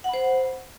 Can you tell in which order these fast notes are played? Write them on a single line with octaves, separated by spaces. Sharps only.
F#5 B5 C5